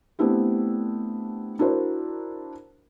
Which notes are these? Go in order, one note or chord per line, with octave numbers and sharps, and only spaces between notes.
A3 B3 C4 D4 E4 G4
D4 E4 F#4 A#4 C5